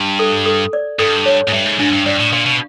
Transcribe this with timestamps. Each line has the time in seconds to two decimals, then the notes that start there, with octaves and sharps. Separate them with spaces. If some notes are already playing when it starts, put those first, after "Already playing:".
Already playing: G2
0.19 A4
0.45 A4
0.73 D5
0.99 G2 A4
1.26 C#5
1.48 G#2
1.53 G2 E5
1.66 G#2
1.79 G#2 D4
1.93 G2
2.06 G2 D5
2.19 A2
2.33 A#2 F5
2.46 B2